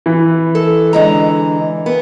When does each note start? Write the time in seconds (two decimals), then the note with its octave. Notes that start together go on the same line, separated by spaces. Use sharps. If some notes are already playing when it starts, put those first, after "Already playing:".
0.06 E3
0.55 A4
0.93 D3 G#3 A#5
1.86 B3